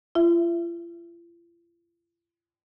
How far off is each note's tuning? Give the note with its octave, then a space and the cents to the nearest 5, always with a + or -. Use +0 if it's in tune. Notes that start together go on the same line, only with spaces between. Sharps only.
F4 -45 E5 +20